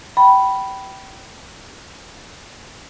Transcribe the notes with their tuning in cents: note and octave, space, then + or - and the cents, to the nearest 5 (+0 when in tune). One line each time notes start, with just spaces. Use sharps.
G5 -25 B5 +0